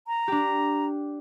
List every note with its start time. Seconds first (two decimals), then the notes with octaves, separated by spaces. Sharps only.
0.08 A#5
0.28 D4 G4